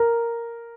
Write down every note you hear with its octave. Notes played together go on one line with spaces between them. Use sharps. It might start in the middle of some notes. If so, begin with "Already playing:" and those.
Already playing: A#4